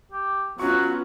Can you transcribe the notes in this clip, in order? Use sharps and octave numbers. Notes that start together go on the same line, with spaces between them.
G4
F#3 B3 C#4 F4 F#4 C#6